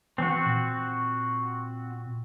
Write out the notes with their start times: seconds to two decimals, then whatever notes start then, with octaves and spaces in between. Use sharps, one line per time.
0.18 E3 C4 F#4
0.46 A#2